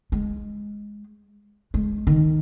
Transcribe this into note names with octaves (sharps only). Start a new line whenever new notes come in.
G#3
G#3
D#3